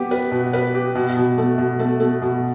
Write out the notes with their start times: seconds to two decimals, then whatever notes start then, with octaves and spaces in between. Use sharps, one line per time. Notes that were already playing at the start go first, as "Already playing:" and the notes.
Already playing: B3 G4
0.11 B4
0.32 B2
0.53 B4
0.74 G4
0.95 B2
1.17 B2
1.38 A3
1.58 B2
1.79 A3
2.00 A3
2.22 B2